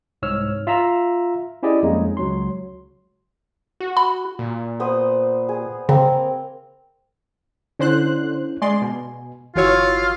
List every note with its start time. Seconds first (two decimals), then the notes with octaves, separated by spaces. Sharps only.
0.22 C2 G#2 C#5 E6 F6
0.67 F4 E5 F5 A#5 E6
1.63 C#4 E4 G4 G#4 D5 D#5
1.83 F2 G3 G#3 A#3 C#4 D#4
2.17 C#2 F#3 C6
3.80 F#4
3.97 B5
4.39 A#2
4.80 B3 C5 D#6
5.49 G#4
5.89 C#3 A#3 C4 A#4
7.79 D3 C#4 E4 C5 F#6
8.62 G#3 D5 G#5 C6
8.81 B2
9.56 G1 E3 F4 F#4 C#5 E6